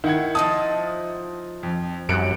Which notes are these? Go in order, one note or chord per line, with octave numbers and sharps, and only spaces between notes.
D#3 E4 F#5 G#6
F3 D#4 A5 D#6
F2
C2 F#2 F#6 C#7 D7